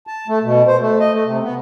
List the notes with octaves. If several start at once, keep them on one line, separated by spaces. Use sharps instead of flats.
A5
A3
B2
C5
A3
D#5
A3
C3
B3